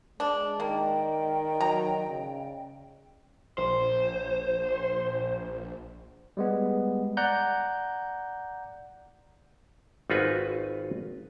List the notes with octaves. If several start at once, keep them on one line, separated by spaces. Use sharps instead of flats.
G#3 D4
D#3 A#3 D5 D#5 G5
F#3 A#5
C#3
A#1 C5
G3 G#3 B3
D5 F#5 A#5 F#6 G6
G#1 D#4 F4 F#4 B4 G#5